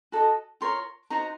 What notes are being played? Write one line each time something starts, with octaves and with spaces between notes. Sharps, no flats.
F#4 A4 D#5
F4 A#4 C#5 C6
D#4 F#4 C5 A#5